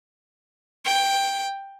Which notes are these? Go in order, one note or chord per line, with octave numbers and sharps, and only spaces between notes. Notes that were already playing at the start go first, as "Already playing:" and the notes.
G5